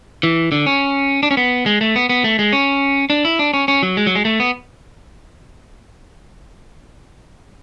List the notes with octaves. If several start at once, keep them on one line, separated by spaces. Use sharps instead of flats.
E3
D3
C#4
D4
C#4
B3
G#3
A3
B3
B3
A3
G#3
C#4
D4
E4
D4
C#4
C#4
F#3
G#3
F#3
G#3
A3
B3